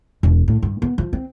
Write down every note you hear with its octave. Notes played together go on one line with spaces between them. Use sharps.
E1
A2
G2
B3
F3
C4